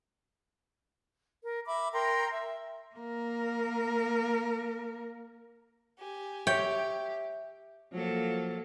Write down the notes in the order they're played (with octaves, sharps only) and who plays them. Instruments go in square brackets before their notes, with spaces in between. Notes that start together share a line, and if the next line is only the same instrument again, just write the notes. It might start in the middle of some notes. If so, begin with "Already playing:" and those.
[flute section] A#4
E5 B5 D6
A#4 G5 A#5 C6
E5
[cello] A#3 A#4
[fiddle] G4 G#5
[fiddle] G4 [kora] C#5 [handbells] E5 [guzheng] G5
[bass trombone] F3 [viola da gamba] F#3 A#3 A4